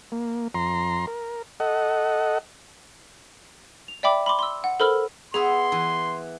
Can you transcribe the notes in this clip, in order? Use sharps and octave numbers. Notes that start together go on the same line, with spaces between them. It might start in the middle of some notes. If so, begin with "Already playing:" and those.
A#3
F2 A#5 C6
A#4
A4 D#5 F#5
F7
D5 E5 G5 B5 D6
B5 C6 D6
C6 E6
F#5
A4 A#4 C5 B5 E6 F6
B3 G#4 C#5 E5 C6
E3